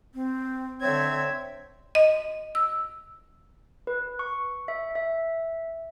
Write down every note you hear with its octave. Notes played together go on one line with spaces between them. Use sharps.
C4
D3 C4 C#5 E5 G#6
D#5
E6
B4
C#6
E5
E5